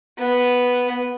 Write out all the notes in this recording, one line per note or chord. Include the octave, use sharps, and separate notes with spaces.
B3